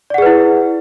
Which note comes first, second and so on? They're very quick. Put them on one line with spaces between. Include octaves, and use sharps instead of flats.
D5 F#5 G#4 B4 E4